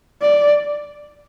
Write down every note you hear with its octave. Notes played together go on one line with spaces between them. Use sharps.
D5